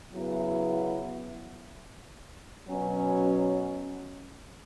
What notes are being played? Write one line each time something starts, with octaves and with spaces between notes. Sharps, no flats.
C#3 F#3 B3 E4
B2 F#3 C#4